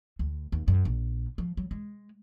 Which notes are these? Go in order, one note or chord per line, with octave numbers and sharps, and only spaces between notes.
D2
D#2
F#2
A#1
F3
F#3
G#3